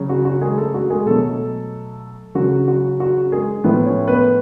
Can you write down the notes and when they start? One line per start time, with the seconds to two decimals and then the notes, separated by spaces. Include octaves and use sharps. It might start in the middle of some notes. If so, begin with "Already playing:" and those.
Already playing: C#3 F#3
0.09 F#4
0.25 F#4
0.41 G#3 G#4
0.57 A3 A4
0.74 F#4
0.90 G#3 G#4
1.06 B2 F#3 A3 A4
2.35 C#3 F#3 F#4
2.68 F#4
3.00 F#4
3.32 G#3 G#4
3.64 A2 F3 B3 B4
3.86 C#4 C#5
4.07 B3 B4